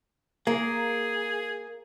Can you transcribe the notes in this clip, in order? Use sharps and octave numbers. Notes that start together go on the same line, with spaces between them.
A#3 G#4